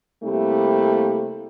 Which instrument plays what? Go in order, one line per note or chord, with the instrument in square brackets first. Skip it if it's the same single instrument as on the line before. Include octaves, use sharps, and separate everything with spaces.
[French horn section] C3 G3 A3 A#3 E4